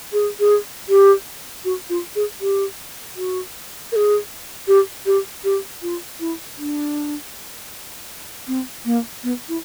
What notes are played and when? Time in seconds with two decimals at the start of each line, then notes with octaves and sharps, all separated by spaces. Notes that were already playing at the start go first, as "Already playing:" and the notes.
0.13 G#4
0.40 G#4
0.89 G4
1.65 F#4
1.90 F4
2.16 G#4
2.41 G4
3.16 F#4
3.92 A#4
3.96 G#4
4.68 G4
5.06 G4
5.44 G4
5.82 F4
6.20 E4
6.57 D4
8.48 C4
8.85 A#3
9.23 B3
9.49 E4